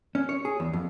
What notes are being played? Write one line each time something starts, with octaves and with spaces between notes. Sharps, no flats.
C#4
C#5
G#4
E2
F2